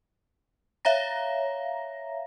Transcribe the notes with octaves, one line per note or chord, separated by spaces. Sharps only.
C#5 E5 F5 A#5 A#6